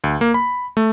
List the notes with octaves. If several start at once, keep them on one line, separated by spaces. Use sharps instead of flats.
D2
A#3
B5
A3